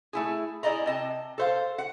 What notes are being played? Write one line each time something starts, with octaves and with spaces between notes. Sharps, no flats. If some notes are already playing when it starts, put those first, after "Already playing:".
A3 E4 G#4
E4 G#4 D5 D#5 A#5
C3 D#5 A5
A4 C5 F5
F#5